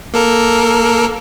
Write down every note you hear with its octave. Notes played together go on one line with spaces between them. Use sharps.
A#3 A4 A#4